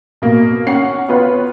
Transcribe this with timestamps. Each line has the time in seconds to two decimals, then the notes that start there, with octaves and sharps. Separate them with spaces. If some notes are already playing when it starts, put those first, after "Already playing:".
0.22 B2 A#3
0.67 C#4 F#5 C7
1.09 B3 F4 B4 C#5